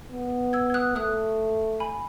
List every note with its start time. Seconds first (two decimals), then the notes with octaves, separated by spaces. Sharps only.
0.11 B3
0.53 E6 G#6
0.70 G#6
0.74 D#6 F#6
0.95 A3 D#6 F#6
1.80 G#5 B5